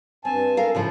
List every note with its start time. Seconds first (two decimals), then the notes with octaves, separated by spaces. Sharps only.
0.25 G2 C4 G#5 A5
0.57 A4 A#4 F5
0.75 A2 C#3 F3